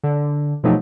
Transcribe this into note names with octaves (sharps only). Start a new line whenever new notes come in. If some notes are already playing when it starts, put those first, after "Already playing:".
D3
B2 F3 F#3 A3 D#4 G4